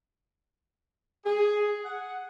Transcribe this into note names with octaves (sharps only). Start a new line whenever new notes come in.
G#4
F#5